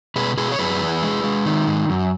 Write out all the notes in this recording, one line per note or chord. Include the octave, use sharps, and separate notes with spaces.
B2 G#4 B4
B2 G#4 B4
C#5
F#2 G#4 B4
E3
G#3
G#3
D#3
G#2
F#2